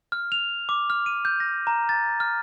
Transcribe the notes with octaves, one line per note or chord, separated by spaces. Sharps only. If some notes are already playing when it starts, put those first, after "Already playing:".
F6
F7
D6
F6
D#7
G6
A#6
A#5
A6
F6